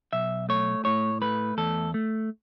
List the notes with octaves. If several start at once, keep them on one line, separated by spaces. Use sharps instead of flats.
B1 E5
A3 C#5
A2 C#5
A3 B4
E2 A4
A3